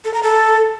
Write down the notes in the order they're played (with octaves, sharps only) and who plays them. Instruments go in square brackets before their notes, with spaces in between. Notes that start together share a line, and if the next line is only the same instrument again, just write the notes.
[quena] A4
A#5
A4